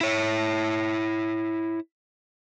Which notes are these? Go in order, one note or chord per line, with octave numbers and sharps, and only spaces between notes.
E4 C#5